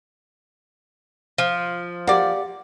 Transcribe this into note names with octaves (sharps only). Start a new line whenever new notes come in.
F3
A#3 G4 D5 F#5